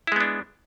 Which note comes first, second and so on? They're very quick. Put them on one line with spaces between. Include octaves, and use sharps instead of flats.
E4 G#3 B3 D4